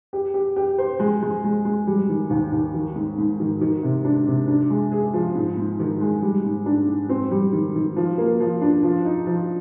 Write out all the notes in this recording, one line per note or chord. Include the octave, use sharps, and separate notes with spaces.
G4
G4
G4
C5
G#3
G#3
G#3
G#3
G3
D#3
D#2
D#2
D#3
G#2
G#2
D#3
D#3
C3
D4
C3
D4
G#3
G#4
F3
G#2
G#2
D#3
G#3
G3
G#2
D4
G#2
C4
G3
D#3
D#3
F3
A#3
F3
D4
F3
D#4
F3